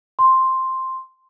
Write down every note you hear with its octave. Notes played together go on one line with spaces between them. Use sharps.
C6